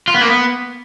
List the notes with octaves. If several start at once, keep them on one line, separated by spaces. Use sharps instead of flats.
F4
B3
A#3
B3